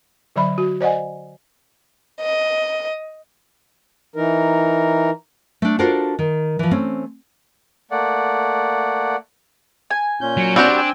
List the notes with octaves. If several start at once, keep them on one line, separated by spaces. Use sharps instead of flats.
D3 F#3 D5 E5 B5
F#4
C5 D5 D#5 F#5 G#5
D#5
E3 D#4 A#4
A3 D4
D4 F4 F#4 A4 A#4 C5
D#3
E3 F3
A3 C4 C#4
A3 A#3 D5 F#5
G#5
A#2 C#4 G6
F#3
G3 C4 D4 F#4 G4
G5 G#5 E6